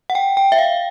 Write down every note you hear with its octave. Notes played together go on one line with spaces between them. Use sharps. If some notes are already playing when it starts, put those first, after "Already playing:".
F#5
G5
G5
E5
F5